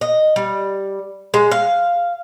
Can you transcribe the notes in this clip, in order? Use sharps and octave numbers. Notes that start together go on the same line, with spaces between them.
D#5
G3
G#3
F5